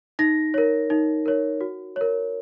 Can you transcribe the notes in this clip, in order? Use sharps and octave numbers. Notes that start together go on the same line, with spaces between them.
D#4 A#6
A#4 C#5
D#4
A#4 C#5
F#4
A#4 C#5